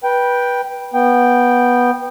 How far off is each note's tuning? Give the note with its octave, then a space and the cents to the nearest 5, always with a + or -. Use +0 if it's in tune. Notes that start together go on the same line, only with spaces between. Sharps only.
B4 -20 G5 +0
B3 -10 G5 +0